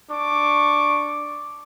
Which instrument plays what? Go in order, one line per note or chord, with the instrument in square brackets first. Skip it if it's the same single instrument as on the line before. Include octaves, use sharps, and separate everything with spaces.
[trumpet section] D4 C#6 D6